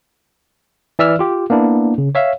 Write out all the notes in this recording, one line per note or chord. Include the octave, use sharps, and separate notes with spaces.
E3 D5 E5 E6 F6
F4 G4
A#3 B3 D4 E4
C#3
C#5 E5 F5